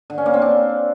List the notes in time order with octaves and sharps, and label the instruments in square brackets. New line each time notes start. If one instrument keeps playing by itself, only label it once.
[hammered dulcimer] D3
C#4
A#3
C4
D4